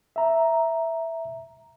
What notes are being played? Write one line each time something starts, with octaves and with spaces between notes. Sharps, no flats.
E5 A#5